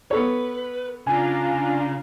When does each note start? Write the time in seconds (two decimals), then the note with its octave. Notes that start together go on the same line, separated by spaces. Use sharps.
0.11 B3 A4 B4 C#5
1.07 C#3 D4 F4 G#5 A#5